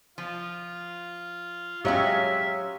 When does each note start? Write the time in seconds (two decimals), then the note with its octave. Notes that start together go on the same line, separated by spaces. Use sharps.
0.18 F3 F4
1.85 F#3 G#3 C#4 G4 C#5 E5 F5